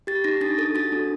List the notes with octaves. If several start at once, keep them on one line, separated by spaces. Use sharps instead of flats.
G4 A6
D#4 A#6
D4 A6
A4 A6
F#4 A6
D4